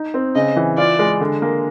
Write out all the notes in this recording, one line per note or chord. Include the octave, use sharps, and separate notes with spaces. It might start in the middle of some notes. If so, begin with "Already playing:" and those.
Already playing: D#4
C4
C#3 D#5
E3
F4 D5
G#3
D3
A#3